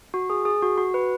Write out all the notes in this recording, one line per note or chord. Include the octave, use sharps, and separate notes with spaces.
F#4
G#4
G#4
F#4
F#4
B4